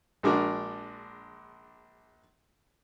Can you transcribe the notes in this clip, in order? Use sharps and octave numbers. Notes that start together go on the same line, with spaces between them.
A#1 G#3 D4 F#4 A#4 A#5